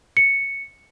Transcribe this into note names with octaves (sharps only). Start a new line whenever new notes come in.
C#7